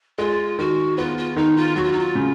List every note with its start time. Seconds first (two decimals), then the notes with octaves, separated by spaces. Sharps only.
0.18 G#3 F4
0.59 D#3 F#4
0.97 B3 F4
1.17 F4
1.37 D#3 D#4
1.57 F4
1.76 F#3 F#4
1.84 F4
1.92 D#4
1.99 F4
2.15 C#3